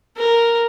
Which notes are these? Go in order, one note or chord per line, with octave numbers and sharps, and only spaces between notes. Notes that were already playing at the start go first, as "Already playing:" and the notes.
A#4